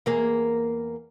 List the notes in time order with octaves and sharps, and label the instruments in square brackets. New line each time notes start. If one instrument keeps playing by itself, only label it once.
[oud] E2 A#3 G#4